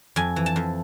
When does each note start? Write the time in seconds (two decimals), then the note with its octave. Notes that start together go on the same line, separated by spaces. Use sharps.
0.16 F2 G#5
0.36 E3
0.46 A5
0.56 F2